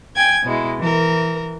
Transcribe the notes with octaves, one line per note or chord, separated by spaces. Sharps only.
G5 G#5 G#6
B2 G#3 E4
E3 A#4